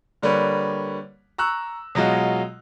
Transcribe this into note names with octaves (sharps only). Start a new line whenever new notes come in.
D3 G3 A#3 B4 C#5
A#5 C#6 E6 F#6
B2 F#3 G#3 F4 F#4